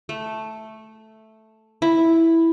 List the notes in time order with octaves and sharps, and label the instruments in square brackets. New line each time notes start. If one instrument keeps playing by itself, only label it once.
[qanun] A3
E4